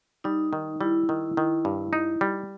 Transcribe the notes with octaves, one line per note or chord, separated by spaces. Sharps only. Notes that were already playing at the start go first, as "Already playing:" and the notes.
G3 D#4
D#3
G3 E4
D#3
D#3
G2
D#4
G3